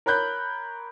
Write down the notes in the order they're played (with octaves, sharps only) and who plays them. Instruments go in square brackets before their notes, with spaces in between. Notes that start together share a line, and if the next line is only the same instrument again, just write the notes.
[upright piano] A#4 C#5 B5 F#6 G6